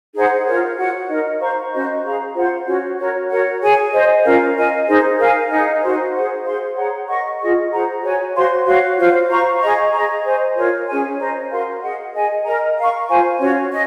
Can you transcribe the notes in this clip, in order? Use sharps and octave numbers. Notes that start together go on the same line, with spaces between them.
D#4 G#4 C5 F#5
F4 A#4 C#5
F#4 C#5 F#5
D#4 A#4 D#5
C5 F5 A#5 C#6
C#4 F#4 C5 D#5
G#4 C5 F5 A#5
F4 C5 F#5 C6
C#4 F#4 C#5
F#4 A#4 C#5
F#4 A#4 C#5 F#5
G#4 C#5 G#5
C5 D#5 G#5
C#4 F4 A#4 F5
A#4 D#5 G#5
D#4 G#4 C5 D#5
A#4 F5 G#5
D#4 G#4 D#5 F#5
D#4 F#4 C5
G#4 C5 F#5
G#4 C5 F5 C6
G#4 C#5 F#5 A#5
A#4 D#5 F#5 C#6
F4 G#4 D#5
G#4 C5 F#5 A#5
F#4 C#5 G#5
F#4 C5 F5 C6
F#4 C#5 F5
F4 C5 F5
C5 F5 A#5 C#6
G#4 D#5 A#5 C#6
G#4 D#5 A#5
C5 D#5 G#5
F4 A#4 C#5
C#4 G#4 C#5 G#5
C5 D#5 A#5
F#4 A#4 F5 C6
G#4 D#5 F#5
G#4 D#5 G#5
A#4 D#5 A#5
A#4 F5 A#5 C#6
F4 C5 F5 G#5
C#4 F#4 C#5
D#5